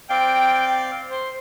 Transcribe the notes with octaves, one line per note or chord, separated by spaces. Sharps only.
C4 D5 F5 G5
C5